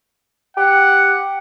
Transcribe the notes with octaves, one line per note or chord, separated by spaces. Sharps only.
G4 F#5